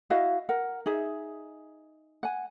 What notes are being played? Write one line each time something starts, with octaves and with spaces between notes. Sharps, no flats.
E4 F#4 D#5 F5
A#4 F#5
D#4 G#4 E5
F#5 G#5